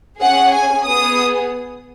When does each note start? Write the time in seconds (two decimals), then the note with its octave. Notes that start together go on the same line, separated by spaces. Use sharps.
0.21 C#4 G#4 F#5
0.54 G#5
0.86 B3 G#4 D#6